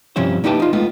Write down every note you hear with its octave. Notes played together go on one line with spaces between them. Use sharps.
G2 C3 F3 C#4 E4 C5
A#3 D#4 E4 G4 B4 A5
D#4 F4
G#3 A3 B3 F4